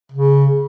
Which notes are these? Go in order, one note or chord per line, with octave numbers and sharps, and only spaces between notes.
C#3